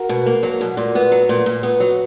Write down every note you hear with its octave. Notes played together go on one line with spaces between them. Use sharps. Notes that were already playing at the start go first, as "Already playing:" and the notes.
Already playing: F#4 A#4
B2
A#3
F#3
B2
A#2
B3
F#3
A#2
A#2
B3
F#3